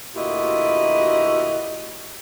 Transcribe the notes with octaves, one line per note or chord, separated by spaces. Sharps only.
D2 A#2 E4 F#4 G4 D#5